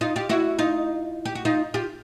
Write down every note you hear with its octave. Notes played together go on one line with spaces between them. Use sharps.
D#4 F4
F4 G4
E4 F#4
D#4 F4
G4
F#4
D#4 F4
F4 G4